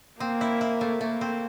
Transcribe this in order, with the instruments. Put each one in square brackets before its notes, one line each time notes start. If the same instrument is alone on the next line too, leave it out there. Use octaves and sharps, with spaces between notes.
[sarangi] A#3 [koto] C4
[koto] E4
E4
A3
[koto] A3 [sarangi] A#3
[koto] C4